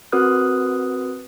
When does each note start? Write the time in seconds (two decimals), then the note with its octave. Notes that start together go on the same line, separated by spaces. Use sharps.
0.12 C4 F#4 A#4 B4 D#6 F#6